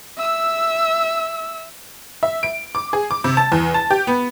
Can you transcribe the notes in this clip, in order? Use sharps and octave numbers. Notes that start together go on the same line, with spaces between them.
E5 E6
E5
D7
D6
G#4
D6
C3
A5
E2
A5
G4
B3